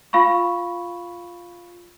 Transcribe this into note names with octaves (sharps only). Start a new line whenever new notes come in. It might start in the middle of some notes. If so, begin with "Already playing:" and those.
F4 F5 B5 C#6